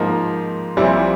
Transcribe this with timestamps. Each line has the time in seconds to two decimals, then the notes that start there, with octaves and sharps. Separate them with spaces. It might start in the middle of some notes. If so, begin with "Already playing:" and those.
Already playing: G#2 F3 A#3 D#4
0.77 A#1 A#2 G3 C4 E4